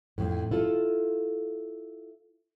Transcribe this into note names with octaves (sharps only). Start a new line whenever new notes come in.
F2 A2
E4 F4 A4